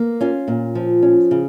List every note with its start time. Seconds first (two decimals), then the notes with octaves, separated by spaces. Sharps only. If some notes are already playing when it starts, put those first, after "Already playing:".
Already playing: A#3
0.21 C#4 F4
0.48 A#2
0.75 F3
1.03 C#4
1.31 C#3